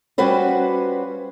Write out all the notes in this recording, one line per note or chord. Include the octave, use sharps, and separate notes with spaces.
G3 C#4 F4 F#4 B4 C5